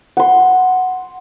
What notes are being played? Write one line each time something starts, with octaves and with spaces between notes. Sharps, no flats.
F#5 C6